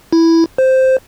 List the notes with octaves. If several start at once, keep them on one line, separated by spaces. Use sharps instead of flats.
E4
C5